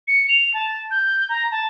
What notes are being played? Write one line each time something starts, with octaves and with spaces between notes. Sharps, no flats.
C#7
F7
A5
G6
A#5
A5